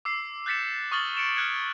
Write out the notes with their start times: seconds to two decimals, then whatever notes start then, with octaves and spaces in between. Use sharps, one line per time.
0.05 D6 E6 C7
0.46 F#6 G6 A6 B6 C#7 E7
0.92 C#6 D#6 F6 A6 F#7 G7
1.17 C#7 D7 E7
1.36 F6 F#6 G#6 C#7